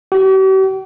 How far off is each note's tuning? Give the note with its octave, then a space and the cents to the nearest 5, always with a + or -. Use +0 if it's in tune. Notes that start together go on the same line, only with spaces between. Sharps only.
G4 -45